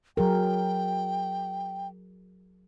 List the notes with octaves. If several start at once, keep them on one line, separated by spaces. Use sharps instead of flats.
F#3 G#4 A#4 G5